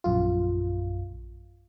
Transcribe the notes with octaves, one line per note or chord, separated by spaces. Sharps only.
A#1 F#2 F4